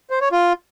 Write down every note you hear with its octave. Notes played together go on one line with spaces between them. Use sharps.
C5
C#5
F4